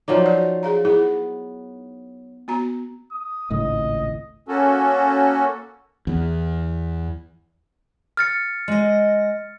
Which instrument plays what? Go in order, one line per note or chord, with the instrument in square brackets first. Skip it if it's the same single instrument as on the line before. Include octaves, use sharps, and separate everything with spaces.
[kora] F3 F#3 D#4 [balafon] C5 D5 D6
[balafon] F#4 D5
G#4 F5 A#5
[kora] B3 [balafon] E4 G#4
[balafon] B3 F#4 A#5
[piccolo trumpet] D#6
[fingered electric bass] G#1 C#2 A2 [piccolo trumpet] D#5
[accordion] A#3 C#4 F#4 A4
[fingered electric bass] E2
[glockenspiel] F6 A6 C#7
[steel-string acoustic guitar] G#3 D#5